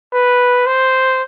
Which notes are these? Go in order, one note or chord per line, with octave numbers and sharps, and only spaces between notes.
B4
C5